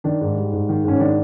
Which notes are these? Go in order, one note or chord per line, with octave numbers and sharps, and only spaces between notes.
D#3 D4
G#2
G3
G#2
D#3
G#2 C#4
D#3 D4